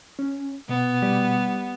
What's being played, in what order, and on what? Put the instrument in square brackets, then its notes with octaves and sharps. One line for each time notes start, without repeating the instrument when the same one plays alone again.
[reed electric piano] C#4
[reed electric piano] B2 [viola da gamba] B3
[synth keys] G3